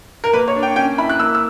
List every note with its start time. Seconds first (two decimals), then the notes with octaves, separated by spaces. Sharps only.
0.24 A#4
0.33 A#3 B4
0.48 C#5
0.55 D4
0.63 G5
0.76 C#4 G5
0.98 E4 B5
1.09 F#6
1.19 A#3 E6
1.35 E6